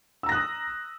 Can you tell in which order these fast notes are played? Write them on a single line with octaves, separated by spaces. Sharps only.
E6 A#5 A#6 F#6 D#6